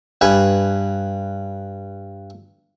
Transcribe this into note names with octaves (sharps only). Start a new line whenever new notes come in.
G2 B4 G#5